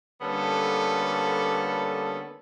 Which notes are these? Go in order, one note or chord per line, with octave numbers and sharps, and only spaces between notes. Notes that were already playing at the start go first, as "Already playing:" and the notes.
D3 G3 A#3 B3 C#4 A4